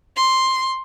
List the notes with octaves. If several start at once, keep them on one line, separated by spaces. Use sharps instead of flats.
C6